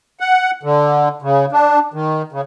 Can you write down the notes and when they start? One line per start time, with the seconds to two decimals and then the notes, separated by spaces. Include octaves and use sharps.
0.20 F#5
0.63 D3
1.22 C#3
1.52 D4
1.94 D#3
2.33 C#3